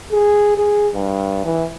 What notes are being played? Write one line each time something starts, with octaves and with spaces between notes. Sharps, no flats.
G#4
G#4
G2
E3